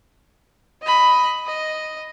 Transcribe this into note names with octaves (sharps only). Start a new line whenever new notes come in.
D#5 B5
D#5